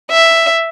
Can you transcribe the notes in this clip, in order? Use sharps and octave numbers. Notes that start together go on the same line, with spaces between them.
E5